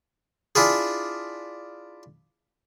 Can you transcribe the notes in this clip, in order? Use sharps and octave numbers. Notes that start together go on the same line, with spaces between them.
D4 E4 F4 G#4